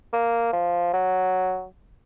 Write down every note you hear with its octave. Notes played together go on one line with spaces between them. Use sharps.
A#3
F3
F#3